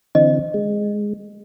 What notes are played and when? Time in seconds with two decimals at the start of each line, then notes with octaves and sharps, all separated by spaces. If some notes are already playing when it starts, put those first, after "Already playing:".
0.15 D3 E3 C4 D#5
0.54 G#3